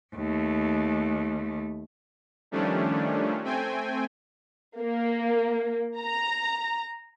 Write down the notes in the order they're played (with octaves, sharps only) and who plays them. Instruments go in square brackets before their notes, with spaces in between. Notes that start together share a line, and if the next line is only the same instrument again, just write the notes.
[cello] D#2 A3
[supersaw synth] D#3 F3 G3 A3 C#4 D4
A3 C4 G5 G#5
[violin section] A#3
A#5